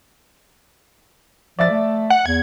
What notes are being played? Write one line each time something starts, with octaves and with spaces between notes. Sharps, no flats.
F3 D5 E5 A6
A3
F#5
E2 G#6